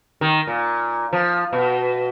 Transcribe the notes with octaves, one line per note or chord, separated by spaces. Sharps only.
D#3
A#2
F3
B2